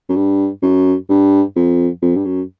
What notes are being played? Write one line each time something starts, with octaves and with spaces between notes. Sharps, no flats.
F#2
G2
F#2
G2
F2
F2
G2
F#2